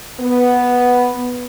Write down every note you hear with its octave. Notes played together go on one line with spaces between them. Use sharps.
B3